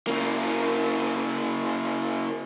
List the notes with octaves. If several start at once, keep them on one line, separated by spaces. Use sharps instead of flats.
C#3 A#3